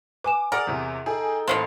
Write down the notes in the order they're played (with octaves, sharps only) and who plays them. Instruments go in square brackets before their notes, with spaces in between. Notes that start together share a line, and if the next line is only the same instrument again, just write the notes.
[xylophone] B4 G#5 E7 [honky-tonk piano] D6
[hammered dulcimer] G#4 [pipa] A#4 [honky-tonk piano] D5 [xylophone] F#5
[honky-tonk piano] E2 C3
[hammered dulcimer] D#4 A4 G5 [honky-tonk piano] G#4
[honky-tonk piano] A1 A2 C7 [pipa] F3 A#3 B3